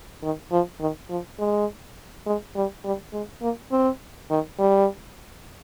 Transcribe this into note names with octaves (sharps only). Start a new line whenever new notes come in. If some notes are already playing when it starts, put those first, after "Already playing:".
D#3
F3
D#3
F3
G#3
G#3
G3
G3
G#3
A#3
C4
D#3
G3